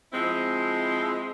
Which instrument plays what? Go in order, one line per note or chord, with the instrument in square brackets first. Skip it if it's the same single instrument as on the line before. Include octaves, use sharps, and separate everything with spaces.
[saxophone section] F3 G#3 C4 E4